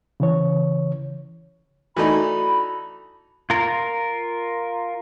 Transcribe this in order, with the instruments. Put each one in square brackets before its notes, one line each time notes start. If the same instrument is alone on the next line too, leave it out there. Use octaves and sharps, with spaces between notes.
[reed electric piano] C#3 E3 C#5
[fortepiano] E3 A3 D#4 [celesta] F#4 A4 D5 [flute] B5
[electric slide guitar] F4 A#4